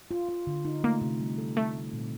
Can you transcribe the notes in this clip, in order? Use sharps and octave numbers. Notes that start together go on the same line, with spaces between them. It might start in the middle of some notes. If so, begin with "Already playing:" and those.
F4
F4
D3
D#4
A3 A#3
C3
G3
A4
A3 C4
C4
A#2